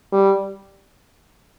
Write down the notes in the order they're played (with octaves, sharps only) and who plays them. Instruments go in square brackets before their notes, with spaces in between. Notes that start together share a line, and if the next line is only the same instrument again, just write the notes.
[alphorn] G3